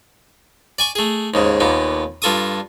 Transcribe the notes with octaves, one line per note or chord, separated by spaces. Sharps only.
D5 G#5 C#6
A3 G#4
D#2 G#2 C#3
D#2 A#2 B3
G2 F4 A4 C#6 D#6